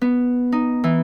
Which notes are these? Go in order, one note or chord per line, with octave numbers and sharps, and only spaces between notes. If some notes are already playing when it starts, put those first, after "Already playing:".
B3
D#4
E3